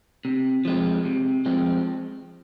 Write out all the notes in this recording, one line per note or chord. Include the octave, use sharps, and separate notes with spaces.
C3
F3 G#3 C4
C3
F3 G#3 C4